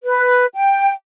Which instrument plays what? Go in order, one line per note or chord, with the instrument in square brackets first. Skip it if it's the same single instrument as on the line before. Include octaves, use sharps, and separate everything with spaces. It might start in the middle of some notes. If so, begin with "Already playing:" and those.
[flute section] B4
G5